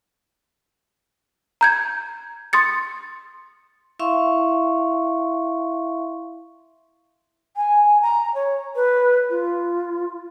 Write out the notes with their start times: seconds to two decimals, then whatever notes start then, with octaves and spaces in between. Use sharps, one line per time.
1.61 A#5 G6 G#6
2.53 C6 D#6 A6 C#7
3.99 E4 E5 F5 C6 C#6
7.56 G#5
8.02 A#5
8.35 C#5
8.76 B4
9.30 F4